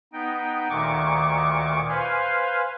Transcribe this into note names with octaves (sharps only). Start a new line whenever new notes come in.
B3 D#4 G5
D2 A#2 D#3 C#6 D6
B4 C5 F5 G#5